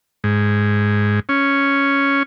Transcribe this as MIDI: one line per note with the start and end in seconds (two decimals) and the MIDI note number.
0.24 1.20 44
1.29 2.23 61